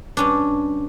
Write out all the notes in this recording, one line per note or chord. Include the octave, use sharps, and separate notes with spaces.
G2 C#4 D4